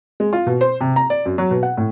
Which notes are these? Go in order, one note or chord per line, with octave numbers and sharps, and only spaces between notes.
G#3
F4
B2
C5
C3
A#5
D5
F#2
F#3
B2
F#5
A2